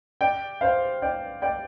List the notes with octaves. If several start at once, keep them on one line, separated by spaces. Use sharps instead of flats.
D5 G5
C5 F5
D5 G5
D5 G5